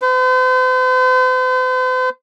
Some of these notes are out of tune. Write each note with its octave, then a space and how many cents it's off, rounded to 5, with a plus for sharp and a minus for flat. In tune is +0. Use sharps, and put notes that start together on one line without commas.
C5 -45